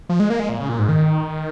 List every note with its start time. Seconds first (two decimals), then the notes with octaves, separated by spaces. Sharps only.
0.09 F3
0.20 G#3
0.30 A#3
0.40 G#3
0.49 A#2
0.60 C#3
0.69 A#2
0.79 G#2
0.89 D#3